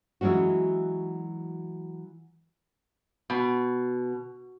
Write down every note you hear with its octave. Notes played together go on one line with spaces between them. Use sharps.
E3 F#3 G#3 C#4 F#4
B2